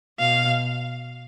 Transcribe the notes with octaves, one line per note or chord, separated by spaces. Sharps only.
B2 F5